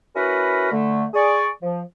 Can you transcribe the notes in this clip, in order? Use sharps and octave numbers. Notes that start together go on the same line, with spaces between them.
C#4 E4 F#4 A#4 B4 B5
D3 A3
G#4 D5 C#6
F3